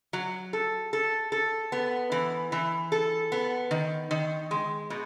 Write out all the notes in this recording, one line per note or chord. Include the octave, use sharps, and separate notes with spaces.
F#3
A4
A4
A4
B3
E3
E3
A4
B3
D#3
D#3
G#3
B2